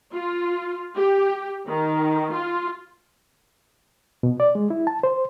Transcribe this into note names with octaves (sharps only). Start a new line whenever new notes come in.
F4
G4
D#3
F4
B2
D5
G#3
E4
A5
C5